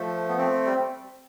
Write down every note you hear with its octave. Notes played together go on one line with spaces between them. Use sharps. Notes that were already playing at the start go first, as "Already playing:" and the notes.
Already playing: F3 A3
B3
A3 C4
G3